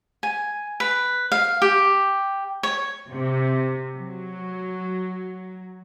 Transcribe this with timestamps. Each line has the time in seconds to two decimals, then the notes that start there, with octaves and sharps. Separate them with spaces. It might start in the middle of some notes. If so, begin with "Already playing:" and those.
0.23 G#5
0.80 B4
1.32 F5
1.62 G4
2.63 C#5
3.11 C3
3.96 F#3